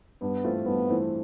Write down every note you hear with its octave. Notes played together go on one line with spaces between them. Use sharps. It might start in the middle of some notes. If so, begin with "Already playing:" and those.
G2 B3
E3 A3 C4 F4
G2 B3
E3 A3 C4 F4